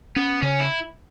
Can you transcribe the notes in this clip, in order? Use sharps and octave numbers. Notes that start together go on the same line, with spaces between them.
B3 C#4
C#3 C#4
E4